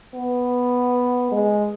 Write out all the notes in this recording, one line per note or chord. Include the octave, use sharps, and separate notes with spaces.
B3
G#3